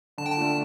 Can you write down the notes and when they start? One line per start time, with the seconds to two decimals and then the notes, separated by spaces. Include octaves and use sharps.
0.18 D3 A5
0.26 G5
0.32 A5
0.37 A3 D4 F4